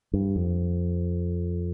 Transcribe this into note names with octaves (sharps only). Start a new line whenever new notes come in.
G2
F2